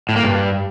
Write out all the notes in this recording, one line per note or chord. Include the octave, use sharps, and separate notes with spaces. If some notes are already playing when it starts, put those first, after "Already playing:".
A2
A#3
G2